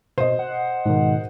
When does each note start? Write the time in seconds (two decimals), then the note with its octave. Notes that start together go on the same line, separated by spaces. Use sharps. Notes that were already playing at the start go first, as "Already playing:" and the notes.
0.18 B2 C5 D#5
0.39 F#5
0.86 G#2 B2 D#3